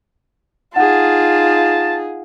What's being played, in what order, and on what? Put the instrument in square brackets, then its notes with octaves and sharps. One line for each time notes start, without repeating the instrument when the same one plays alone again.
[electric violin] D#4 G#4 [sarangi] F4 [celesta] F#5 [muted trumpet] A5